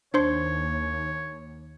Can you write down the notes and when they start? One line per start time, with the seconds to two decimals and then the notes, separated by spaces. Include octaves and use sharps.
0.14 D#2 D4 C5 C#5 C6